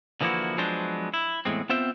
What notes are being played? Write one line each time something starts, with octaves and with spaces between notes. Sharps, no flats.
D3 E3 F3 A#3 E4 F#4
F3 F#3 G#3 B3 D4 C5
E4
E2 A2 C#3 G#3 C4
B3 C4 F4 C5 E5 G5